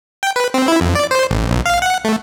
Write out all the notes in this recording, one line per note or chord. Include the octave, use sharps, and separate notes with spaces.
G5
B4
C4
E4
F2
D5
C5
A1
B1
F5
F#5
A3